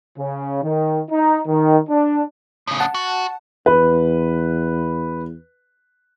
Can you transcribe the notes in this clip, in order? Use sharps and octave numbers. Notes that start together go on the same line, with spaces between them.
C#3
D#3
D#4
D#3
D4
A2 C#3
F#5 A5
F#4
E2 B4